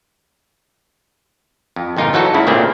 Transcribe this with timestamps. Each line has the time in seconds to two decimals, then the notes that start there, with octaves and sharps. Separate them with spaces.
1.76 F2
1.97 G1 A#2 D#4 F4 A#4
2.13 E3 F#3 D#4 F#4 A4
2.34 C#2 G#2 C#3 E4
2.47 A#2 C#3 A3 A#3 C4 D4